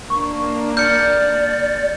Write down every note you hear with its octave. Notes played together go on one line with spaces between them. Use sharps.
A#3 D4 C#6
D5 F6 G6 C#7